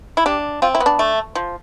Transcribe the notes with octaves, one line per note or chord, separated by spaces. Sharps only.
E4
D4 G4
C4 F4
E4
B3
D4
A3
F3